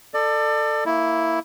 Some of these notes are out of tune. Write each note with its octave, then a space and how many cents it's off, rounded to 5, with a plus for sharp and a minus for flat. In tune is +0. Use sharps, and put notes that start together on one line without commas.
A4 +15 D5 +25
A#3 -15 E4 +0